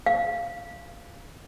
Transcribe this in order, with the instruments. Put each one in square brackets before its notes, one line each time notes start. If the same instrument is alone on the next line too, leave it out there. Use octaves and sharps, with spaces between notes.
[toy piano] F5